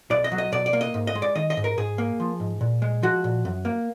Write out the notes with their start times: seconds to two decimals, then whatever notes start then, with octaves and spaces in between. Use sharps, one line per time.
0.10 B1 D5
0.24 D#5
0.32 F#3
0.38 D#5
0.52 B2 D5
0.66 D5
0.73 A#3
0.81 D#5
0.94 G#2
1.07 D#5
1.15 G#3
1.22 D5
1.35 D#3 D#5
1.50 D#5
1.57 G#2
1.64 A#4
1.77 G#2 G#4
1.98 A#3
2.20 F3
2.40 G#2
2.61 A#2
2.82 G#3
3.03 F3 F#4
3.24 A#2
3.45 F#2
3.65 A#3